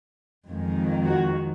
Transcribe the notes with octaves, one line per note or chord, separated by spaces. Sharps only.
F2 D#3 G#3
F#4